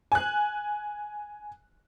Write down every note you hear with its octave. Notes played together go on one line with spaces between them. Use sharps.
G#5 F#6